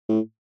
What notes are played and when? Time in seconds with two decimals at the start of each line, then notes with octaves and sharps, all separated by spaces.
0.09 A2